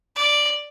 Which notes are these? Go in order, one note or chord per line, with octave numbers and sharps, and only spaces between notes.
D5